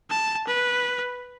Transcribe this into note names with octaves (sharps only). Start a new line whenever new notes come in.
A5
B4